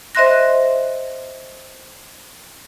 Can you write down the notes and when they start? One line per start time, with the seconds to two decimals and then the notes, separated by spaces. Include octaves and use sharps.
0.15 C5 D#5 E5 C6 F#6 A#6